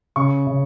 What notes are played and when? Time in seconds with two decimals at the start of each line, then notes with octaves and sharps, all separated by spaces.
0.16 C#3 C#6
0.47 C#3